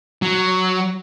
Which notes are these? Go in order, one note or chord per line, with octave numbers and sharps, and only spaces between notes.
F#3